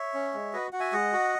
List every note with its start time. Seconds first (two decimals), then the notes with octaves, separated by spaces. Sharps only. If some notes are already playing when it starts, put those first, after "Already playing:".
Already playing: C#5 E5
0.14 C#4
0.34 G#3
0.53 F#4 B4 D#5
0.73 F#4 F#5
0.80 E5 G#5
0.92 G#3 D#5 F#5
1.13 F#4